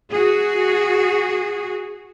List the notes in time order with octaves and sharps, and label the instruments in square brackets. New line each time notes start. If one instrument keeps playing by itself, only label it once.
[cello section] F#4 G#4